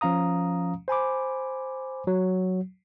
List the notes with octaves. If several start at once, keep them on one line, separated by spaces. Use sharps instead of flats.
F3 C#4 F5 A#5 D#6
C5 G#5 B5 D6
F#3